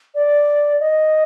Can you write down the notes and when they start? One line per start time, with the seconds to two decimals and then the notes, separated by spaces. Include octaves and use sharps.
0.15 D5
0.80 D#5